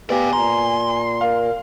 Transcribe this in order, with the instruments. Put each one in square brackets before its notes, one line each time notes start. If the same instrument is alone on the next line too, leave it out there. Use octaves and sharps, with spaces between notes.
[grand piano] B3 [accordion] G4 [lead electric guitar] D5 F5 [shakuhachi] G#5
[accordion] A#2 [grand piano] A#5 [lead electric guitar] C6
[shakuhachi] A#4 [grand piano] F5